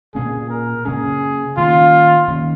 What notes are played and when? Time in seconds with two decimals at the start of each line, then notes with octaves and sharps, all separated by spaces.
0.15 A#2 A#3 C#4 G#4
0.50 A#4
0.85 C#3 A#3 C#4 G#4
1.57 D#3 A#3 C#4 F4
2.28 D#3 A#3 C#4